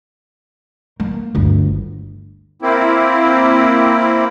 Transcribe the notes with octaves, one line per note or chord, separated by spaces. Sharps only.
A#3
G1 D2
A#3 C4 E4